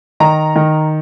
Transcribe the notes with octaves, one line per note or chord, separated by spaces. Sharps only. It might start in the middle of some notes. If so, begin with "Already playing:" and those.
D#3 A#5
D#3